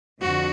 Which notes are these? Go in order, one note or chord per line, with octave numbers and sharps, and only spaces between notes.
F2 D3 F3 F#4